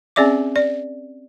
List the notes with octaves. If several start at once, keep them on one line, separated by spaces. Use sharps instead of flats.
C4 C#4 G#4 D5 E5 D6
D5